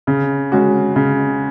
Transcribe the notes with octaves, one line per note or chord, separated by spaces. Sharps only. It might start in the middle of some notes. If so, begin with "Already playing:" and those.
C#3
G#3 C#4 F#4
C#3